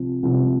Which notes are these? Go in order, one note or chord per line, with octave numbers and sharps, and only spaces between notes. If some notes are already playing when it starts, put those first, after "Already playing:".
Already playing: C2 C3 F3
C2 C3 F3